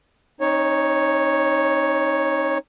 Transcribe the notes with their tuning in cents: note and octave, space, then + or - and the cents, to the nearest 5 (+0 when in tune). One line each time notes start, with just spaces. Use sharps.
C4 +45 D#4 +0 C#5 +0